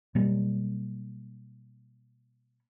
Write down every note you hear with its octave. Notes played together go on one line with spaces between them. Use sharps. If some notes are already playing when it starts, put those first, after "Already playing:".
B2 F#3 G3 A#3